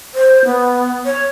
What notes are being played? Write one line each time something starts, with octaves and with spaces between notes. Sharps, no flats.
C5
B3
C#5